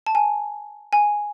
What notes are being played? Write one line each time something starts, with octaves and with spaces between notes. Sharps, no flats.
A5
G#5
G#5